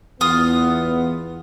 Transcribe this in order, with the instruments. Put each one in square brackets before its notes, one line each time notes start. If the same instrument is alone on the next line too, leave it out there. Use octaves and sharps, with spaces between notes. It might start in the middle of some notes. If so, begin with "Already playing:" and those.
[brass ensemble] E2 B3 [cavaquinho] F4 D#6